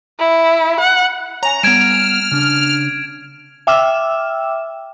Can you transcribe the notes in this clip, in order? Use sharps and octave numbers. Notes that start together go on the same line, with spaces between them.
E4
F#5
C#5 G#5 A#5
G3 B3 F6 G#6 D7 E7
C#3 D4
E5 G5 D6 E6 F6 E7